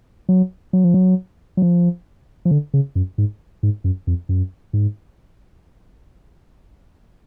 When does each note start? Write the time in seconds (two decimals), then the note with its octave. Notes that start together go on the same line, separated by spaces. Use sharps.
0.29 F#3
0.73 F#3
0.84 F3
0.94 F#3
1.57 F#3
1.62 F3
2.45 F3
2.51 D3
2.74 C#3
2.95 F#2
3.18 G#2
3.63 G#2
3.84 F#2
4.07 F2
4.29 F#2
4.73 G#2